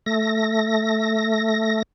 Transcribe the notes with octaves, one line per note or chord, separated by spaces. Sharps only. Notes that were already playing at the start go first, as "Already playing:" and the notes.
A3 A#6